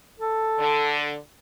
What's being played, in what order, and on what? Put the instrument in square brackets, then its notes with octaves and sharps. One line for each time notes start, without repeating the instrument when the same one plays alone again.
[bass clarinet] A4
[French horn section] D3